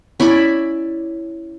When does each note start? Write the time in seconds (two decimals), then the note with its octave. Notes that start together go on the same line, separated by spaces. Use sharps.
0.20 C#4 E4 D5 B5